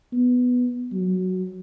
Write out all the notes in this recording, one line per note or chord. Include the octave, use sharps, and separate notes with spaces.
B3
F#3